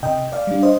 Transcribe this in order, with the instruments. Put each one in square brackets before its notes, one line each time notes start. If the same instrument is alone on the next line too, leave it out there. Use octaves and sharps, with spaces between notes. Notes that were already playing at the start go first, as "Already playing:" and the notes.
[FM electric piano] C3 D#5 G5
D5 F5
G3 D4
C5 D#5